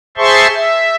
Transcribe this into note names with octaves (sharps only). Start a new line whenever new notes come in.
G#4 C5 E5 A5 C6 C#6
E5